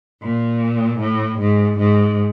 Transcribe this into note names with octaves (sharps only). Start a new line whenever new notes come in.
A#2
A2
G#2
G#2